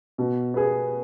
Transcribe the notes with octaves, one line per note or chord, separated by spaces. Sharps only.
B2
B3 G#4